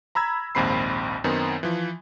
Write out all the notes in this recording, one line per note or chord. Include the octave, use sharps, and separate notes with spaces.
A#5 B5 E6 G#6
A#1 D#2 G#2 C4 B5 C7
F#2 D#3 B3 C4
E3 F3